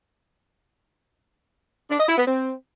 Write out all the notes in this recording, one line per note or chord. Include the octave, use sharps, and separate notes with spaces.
D4
D#5
E4
B3
C4